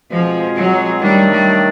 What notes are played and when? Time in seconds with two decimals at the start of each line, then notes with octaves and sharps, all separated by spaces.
0.10 B2 F3 G#3 C4 F4 G#4
0.55 F#3
1.01 D#3 F#3 G3 A3 D4
1.31 G3